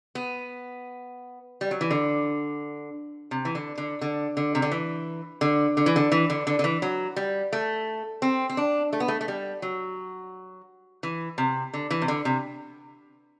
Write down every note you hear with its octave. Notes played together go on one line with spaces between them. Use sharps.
B3
G3
F#3
E3
D3
C3
E3
D3
D3
D3
D3
C3
D3
E3
D3
D3
E3
D3
E3
D3
D3
D3
E3
F#3
G3
A3
C4
C4
D4
A3
B3
A3
A3
G3
F#3
E3
C3
D3
E3
C3
D3
C3